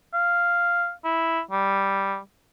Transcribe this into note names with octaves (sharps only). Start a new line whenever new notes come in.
F5
E4
G3